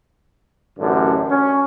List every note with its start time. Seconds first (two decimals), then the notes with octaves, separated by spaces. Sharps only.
0.79 A1 F#2 D3
1.30 C#4